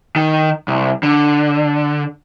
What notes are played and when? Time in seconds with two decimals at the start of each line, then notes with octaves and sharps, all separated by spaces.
0.16 D#3
0.68 C2
1.03 D3